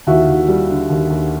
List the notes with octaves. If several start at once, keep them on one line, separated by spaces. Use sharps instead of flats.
D#2 E4 F#4
D#2
G3
D3
D#2
D#2